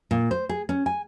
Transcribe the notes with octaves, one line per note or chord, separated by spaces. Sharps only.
A#2
C5
G#4
C#4
G#5